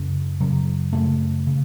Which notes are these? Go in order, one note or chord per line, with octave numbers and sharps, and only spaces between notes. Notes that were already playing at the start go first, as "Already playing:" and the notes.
Already playing: F#2 C#3
F#2 C#3 F#3
F#2 C#3 A3
C#3